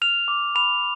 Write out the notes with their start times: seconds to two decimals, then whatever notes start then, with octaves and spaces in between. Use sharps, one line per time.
0.02 F6 F7
0.28 D6
0.55 B5 F7